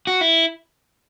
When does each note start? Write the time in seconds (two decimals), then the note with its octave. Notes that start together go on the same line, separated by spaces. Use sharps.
0.07 F#4
0.21 E4